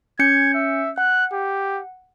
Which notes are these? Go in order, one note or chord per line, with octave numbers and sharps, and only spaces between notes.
C#4 G6 G#6 C#7
E5
F#5 F#6
G4